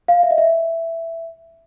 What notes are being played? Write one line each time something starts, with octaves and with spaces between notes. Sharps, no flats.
F5
E5
D#5
E5